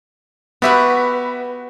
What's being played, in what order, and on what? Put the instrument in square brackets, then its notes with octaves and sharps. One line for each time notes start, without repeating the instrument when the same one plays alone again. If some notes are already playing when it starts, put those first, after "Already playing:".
[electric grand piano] B3 E5 [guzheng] F#4 G4 B4